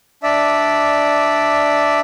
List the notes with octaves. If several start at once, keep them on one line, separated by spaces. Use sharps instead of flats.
D4 D5 E5